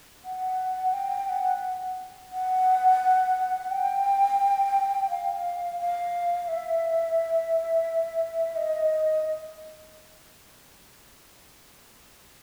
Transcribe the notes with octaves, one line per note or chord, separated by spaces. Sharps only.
F#5
G5
F#5
F#5
G5
F5
F5
E5
D#5